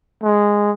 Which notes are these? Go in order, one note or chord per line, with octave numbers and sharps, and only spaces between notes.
G#3